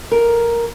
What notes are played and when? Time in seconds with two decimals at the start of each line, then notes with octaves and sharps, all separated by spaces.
0.12 A#4